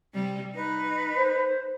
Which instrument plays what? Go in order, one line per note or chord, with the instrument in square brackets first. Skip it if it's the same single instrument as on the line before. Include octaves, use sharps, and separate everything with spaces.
[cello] C3 G3
[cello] D#4 [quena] B4
[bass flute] C5